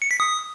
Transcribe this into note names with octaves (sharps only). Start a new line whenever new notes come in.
C#7
B6
D#6